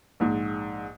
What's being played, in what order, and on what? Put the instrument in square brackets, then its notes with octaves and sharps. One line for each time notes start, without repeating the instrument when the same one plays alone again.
[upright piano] A#1 G#2